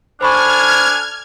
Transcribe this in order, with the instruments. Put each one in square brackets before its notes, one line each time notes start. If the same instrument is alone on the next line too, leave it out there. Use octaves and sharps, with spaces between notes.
[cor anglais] D4 [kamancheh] A4 G#5 [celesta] C5 B5 C#6 [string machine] F6 G#6